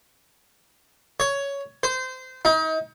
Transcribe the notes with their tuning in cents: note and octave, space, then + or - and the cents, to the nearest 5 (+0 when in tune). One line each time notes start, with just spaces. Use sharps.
C#5 +10
C5 -25
D#4 +35